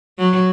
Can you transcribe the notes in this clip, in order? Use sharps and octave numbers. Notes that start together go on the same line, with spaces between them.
F#3